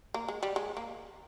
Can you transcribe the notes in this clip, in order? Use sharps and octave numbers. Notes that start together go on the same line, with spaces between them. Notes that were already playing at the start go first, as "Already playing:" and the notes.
A#3
G#3
G3
G#3
A#3